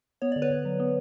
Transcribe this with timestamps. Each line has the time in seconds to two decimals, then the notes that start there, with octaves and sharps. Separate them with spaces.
0.22 B3 C#5
0.32 D3 D5
0.42 B4 C#5
0.50 D3
0.65 F#3
0.80 B3